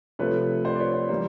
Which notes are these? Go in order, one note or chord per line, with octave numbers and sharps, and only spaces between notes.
C3 F3 A3 B4 C#5
C5 D5
D5
B4 C#5
C5
E3 G3 A#3 C5